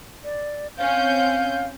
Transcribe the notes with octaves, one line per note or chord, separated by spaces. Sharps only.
D5
C4 C#4 F5 G6